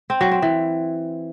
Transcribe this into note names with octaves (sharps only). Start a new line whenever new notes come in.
C4
F#3
C4
E3